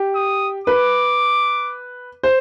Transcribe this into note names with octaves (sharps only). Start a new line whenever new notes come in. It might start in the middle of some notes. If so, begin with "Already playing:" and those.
Already playing: G4
D#6
B4 D6
C5